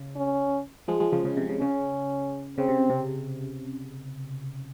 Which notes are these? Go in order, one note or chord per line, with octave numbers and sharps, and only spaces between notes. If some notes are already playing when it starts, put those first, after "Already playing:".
Already playing: C#3
C#4
F3 G#3
F3 G#3
C#3 F3
C#3
C3
C#3
C#3 C#4
C#3 C4
C3
C3